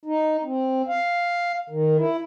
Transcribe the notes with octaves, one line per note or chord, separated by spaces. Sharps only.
D#4
C4
F5
D#3
E4